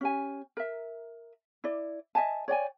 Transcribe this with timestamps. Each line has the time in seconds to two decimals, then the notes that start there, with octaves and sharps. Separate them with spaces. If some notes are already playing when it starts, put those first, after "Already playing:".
0.01 C#4 G4 G#5
0.57 A#4 E5
1.64 E4 D5
2.15 D#5 E5 G#5 A5
2.48 C#5 D5 G5 G#5